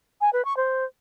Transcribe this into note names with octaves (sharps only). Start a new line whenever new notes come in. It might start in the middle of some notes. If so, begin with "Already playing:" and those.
G#5
B4
C#6
C5